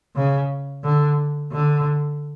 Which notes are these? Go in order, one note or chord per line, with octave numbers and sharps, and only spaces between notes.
C#3
D3
D3